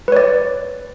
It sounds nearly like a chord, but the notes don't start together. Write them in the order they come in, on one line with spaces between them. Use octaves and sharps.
B4 C#5 D5